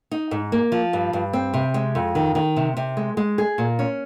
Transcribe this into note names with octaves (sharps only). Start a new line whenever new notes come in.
D#4
G#2
A#3
F3
G2
G2
C4
C3
G#3
F2
D#3
D#3
C3
C3
G#3
G#3
G#4
A#2
C#4